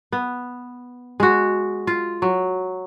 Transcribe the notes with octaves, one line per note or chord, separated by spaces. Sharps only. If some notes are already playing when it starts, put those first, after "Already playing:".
B3
G#3 F#4
F4
F#3